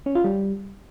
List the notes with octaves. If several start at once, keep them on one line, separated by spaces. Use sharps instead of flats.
C#4
F4
G3